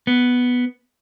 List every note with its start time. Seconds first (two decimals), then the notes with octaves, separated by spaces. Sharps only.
0.07 B3